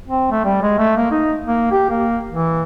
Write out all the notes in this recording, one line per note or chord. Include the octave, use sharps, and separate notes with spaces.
C4
A3
G3
G#3
A3
A#3
D#4
A#3
G4
A#3
E3